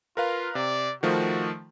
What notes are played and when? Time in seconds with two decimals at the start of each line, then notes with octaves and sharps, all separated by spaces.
0.17 F4 A#4 B4 F5
0.55 C3 D5
1.03 D#3 F3 A3 F#4